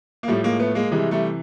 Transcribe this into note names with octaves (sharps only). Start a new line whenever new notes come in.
A#3
A2 F3 G3 A3
G#3 A#3
A3 B3
G#3 A#3
C3 E3 G3 G#3
G3 A3